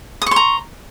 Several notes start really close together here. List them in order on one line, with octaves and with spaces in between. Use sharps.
D#6 C#6 C6 A#5